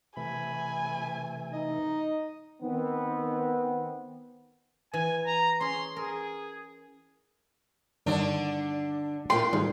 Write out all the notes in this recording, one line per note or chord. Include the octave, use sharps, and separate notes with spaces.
C3 E3 A3 G#5 B5
D#4 D#5
D#3 B3 C4
E3 G#5
A#5
C#4 G#4 C6
G#4 A#4
G2 D3 D#3 D4 C#5
A#2 G5 C6
G#2 D#3 G3 A3